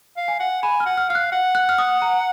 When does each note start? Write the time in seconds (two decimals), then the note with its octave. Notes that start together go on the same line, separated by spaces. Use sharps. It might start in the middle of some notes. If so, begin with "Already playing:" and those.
0.17 F5
0.28 G#5
0.40 F#5
0.63 G#5 B5
0.80 F6
0.86 F#5
0.97 F6
1.09 F5 F6
1.15 F#6
1.32 F#5
1.55 F#6
1.69 F6
1.78 D#6
2.02 A#5